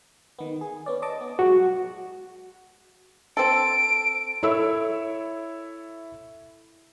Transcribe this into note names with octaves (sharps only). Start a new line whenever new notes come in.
D#3 B3
G#4
B3 C#4 D5
D#5 A5 D6
B3
F#3 G#3 F#4
C4 A4 D7
E4 A4 C#5 E5 B5 E6